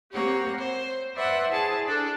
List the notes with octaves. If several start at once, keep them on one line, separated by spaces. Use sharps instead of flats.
A#3 C4 G4 C#5 F#5
C5
B4 C5 D5 E5 F#5 C6
E4 G#4 A5
D4 A4 D5